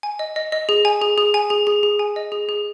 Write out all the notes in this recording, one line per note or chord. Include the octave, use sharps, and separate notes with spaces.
G#5
D#5
D#5
D#5
G#4
G#5
G#4
G#4
G#5
G#4
G#4
G#4
G#5
D#5
G#4
G#4